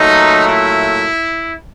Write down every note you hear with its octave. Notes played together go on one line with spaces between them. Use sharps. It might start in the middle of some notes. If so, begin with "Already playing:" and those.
Already playing: A#2 F#3 A3 D#4
E4